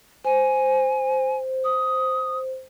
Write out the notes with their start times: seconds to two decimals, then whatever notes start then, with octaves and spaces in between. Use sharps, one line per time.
0.25 C5 G#5
1.64 D#6